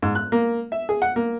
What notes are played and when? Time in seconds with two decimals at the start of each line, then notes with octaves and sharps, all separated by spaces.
0.03 G#2
0.15 F#6
0.32 A#3
0.72 E5
0.89 G#4
1.02 F#5
1.16 A#3